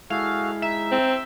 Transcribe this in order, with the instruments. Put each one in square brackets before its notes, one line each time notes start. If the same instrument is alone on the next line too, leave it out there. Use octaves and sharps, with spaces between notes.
[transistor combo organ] G#3 E4 [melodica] F#4 G#4 A4 [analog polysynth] F5
[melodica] D#4 [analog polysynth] E5
[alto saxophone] C4